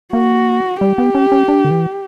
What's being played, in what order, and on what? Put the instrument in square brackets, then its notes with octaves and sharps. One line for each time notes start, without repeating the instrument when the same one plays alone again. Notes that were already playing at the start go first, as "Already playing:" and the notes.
[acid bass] A#3 [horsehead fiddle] F#4
[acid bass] G3 [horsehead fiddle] G4
[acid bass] B3
C#4
C#4
D4
D3
E3